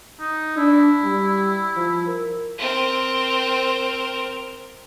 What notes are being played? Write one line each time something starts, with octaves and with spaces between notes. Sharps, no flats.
D#4
D4 E4
G3
F3
A#4
C4 A#4